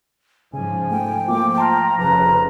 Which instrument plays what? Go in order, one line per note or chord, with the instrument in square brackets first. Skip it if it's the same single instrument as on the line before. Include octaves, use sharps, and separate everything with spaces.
[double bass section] G#2 F3 [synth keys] C#3 [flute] G#5
[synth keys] A3 [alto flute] G5
[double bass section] F3 [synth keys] A3 A#3 F4 [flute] D6
[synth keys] A5 C6 F6 [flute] A#5
[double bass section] F1 C#3 [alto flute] B4 [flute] A#5